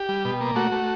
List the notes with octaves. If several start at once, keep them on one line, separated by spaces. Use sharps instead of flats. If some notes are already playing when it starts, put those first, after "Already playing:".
Already playing: G4
G3
B2
A#3
A3 F#4
A3